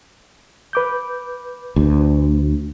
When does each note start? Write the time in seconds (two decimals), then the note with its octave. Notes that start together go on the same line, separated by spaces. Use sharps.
0.73 B4 D6 G6
1.76 D2